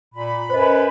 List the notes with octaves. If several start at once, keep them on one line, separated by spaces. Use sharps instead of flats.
A#2 B5
F#2 B4 C5 D#5